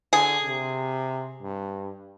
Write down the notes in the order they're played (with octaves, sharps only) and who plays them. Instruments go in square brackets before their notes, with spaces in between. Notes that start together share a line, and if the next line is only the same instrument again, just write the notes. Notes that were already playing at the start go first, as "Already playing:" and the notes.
[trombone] D3 [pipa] G#4
[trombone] C3
G2